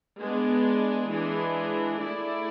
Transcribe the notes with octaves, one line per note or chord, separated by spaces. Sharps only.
G#3 B3 D4 G#4
E3 G#3 D4 G#4
A3 E4 G#4 D5